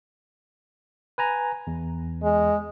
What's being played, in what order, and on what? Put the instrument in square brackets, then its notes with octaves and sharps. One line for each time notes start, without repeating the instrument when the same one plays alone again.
[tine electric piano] B4 G#5 A#5
E2
[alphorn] G#3